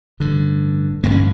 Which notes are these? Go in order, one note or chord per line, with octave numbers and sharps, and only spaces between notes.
A1 G2 D3
A1 G2 D3 A#3
C#4